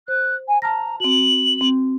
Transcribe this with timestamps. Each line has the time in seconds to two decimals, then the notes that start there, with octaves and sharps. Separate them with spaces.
0.08 C5 F#6
0.48 G#5
0.62 A5 A#5 F6 A#6
1.00 C4 F#4 F#7
1.61 C4